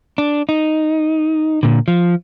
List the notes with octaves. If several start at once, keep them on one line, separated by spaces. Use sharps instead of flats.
D4
D#4
A#2 D3
F3